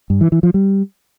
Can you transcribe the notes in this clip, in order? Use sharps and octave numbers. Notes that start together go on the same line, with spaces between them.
G2
E3
E3
F3
G3